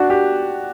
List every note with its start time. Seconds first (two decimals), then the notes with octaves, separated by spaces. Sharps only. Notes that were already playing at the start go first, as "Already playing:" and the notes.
Already playing: D4 F#4
0.10 G4